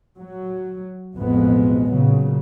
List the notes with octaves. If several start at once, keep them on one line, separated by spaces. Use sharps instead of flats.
F#3
A1 F2 B2 G#3 B3
A#2 C#3 F#3